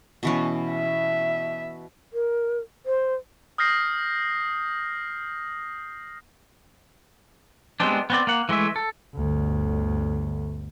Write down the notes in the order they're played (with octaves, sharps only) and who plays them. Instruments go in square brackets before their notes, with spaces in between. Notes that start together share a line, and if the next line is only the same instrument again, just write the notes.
[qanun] B2 E3 C#4
[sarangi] E5
[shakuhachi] A#4
C5
[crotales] D#6 F6 G6 A#6 C7
[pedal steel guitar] G3 G#3 B3 C4 D4
B3 C4 D5
A#3 F#5
E3 G#3 A3 E5
A4
[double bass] G1 D2